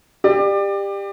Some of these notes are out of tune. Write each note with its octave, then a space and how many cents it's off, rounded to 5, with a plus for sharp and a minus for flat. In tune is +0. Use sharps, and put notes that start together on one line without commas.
G4 +20 D5 +30